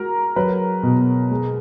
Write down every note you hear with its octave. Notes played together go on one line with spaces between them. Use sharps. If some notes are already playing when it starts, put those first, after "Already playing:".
Already playing: G#3 F#4 A#4
F#3 B4
B2
G#3